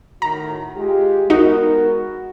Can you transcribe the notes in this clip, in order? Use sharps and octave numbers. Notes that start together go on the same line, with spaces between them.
A2 D#3 F#4 A#5
G#3 F4 G4
G#3 B3 D#4 F#4 A#4